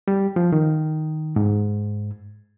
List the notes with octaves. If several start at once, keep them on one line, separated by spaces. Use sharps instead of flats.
G3
F3
D#3
G#2